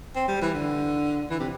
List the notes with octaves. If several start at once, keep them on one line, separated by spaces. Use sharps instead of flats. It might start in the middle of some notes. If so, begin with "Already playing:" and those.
C4
G3
E3
D3
E3
C3